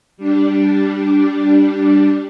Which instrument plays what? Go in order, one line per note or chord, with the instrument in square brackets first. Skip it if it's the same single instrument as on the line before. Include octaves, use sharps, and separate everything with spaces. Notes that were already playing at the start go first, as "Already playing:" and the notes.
[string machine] G3 D4